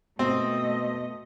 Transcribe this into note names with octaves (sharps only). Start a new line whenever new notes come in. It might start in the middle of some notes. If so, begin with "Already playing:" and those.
B2 A3 C4 D#5